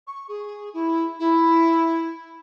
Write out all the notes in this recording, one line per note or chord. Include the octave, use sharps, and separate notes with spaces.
C#6
G#4
E4
E4